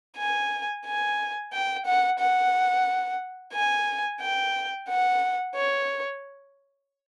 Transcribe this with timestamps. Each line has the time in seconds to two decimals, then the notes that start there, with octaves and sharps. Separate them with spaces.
0.18 G#5
0.86 G#5
1.53 G5
1.86 F#5
2.19 F#5
3.54 G#5
4.21 G5
4.88 F#5
5.55 C#5